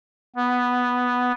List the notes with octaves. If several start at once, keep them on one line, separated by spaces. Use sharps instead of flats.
B3